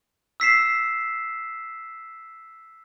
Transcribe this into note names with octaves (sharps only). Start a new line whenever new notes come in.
E6 B6 C7 E7